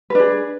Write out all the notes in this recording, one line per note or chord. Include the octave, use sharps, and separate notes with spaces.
D4 G#4 B4